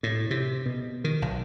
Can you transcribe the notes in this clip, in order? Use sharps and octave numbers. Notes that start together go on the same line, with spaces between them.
A2
C3
B2
D#3
B1